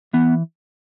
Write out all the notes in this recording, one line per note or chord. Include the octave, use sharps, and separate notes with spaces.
E3 B3